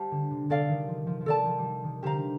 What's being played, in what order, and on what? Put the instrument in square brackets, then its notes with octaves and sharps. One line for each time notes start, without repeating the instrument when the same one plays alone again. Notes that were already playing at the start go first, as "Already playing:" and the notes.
Already playing: [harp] G3 [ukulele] G4 C5 F5 A5
[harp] D3
C3
[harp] C3 [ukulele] A4 D5 F5
[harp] D#3
F3
F3
F3
[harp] D#3 [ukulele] A4 D5 A5
[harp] F3
G3
F3
D#3
[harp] D3 [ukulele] G4 C5 F5 A#5